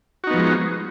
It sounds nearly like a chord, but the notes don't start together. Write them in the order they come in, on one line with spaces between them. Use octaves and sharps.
F#4 D#4 B3 F3 G#3